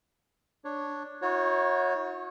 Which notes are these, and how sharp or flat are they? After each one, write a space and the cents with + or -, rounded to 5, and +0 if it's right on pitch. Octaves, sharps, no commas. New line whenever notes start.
D4 +0 C#5 +0
D#4 +45 F#4 -35 C#5 -10